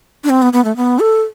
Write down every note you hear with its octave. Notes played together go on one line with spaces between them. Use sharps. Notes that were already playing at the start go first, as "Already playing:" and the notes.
D4
C4
B3
B3
A3
B3
A4